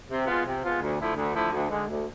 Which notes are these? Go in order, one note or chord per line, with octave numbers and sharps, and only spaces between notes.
C3
G#3 B3 F4
C3
G#3 B3 F4
D2
D3 F3 A3 E4
D2
D3 F3 A3 E4
D2
D3 G#3
D2